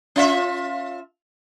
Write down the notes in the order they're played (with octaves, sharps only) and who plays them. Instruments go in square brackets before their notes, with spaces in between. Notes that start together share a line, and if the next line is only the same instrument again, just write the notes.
[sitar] C#4 F4 E5